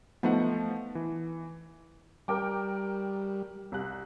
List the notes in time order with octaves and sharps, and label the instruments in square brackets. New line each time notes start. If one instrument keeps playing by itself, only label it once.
[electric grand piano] F3 A3 F#5 [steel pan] B3 D#4
[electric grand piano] E3
[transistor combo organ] G3 [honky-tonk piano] A#4 G5 D6
[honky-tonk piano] C2 F#6